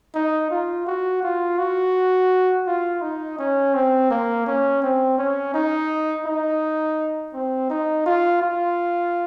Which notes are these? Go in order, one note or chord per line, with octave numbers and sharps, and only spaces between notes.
D#4
F4
F#4
F4
F#4
F4
D#4
C#4
C4
A#3
C#4
C4
C#4
D#4
D#4
C4
D#4
F4
F4